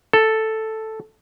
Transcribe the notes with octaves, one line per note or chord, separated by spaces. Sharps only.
A4